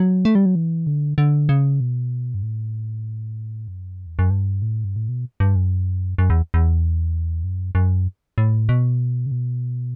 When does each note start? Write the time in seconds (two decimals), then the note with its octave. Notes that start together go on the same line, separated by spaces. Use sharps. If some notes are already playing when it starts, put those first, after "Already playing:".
Already playing: F#3
0.25 A3
0.35 G3
0.46 F#3
0.55 E3
0.87 D3
1.18 D3
1.49 C#3
1.80 B2
2.34 G2
2.43 A2
3.68 F#2
4.06 E2
4.19 F#2
4.30 G2
4.62 A2
4.84 G2
4.96 A2
5.09 B2
5.40 G2
5.56 F#2
6.18 F#2
6.30 E2
6.54 E2
7.44 F#2
7.75 F#2
8.38 A2
8.69 B2
9.26 C#3
9.32 B2